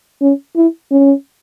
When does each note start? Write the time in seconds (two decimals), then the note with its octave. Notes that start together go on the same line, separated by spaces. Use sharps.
0.21 C#4
0.56 E4
0.91 C#4